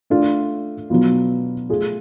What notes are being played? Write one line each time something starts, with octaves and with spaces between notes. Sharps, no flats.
A3 D4 F4
B2 F#3 B3 F4
A3 F4 G#4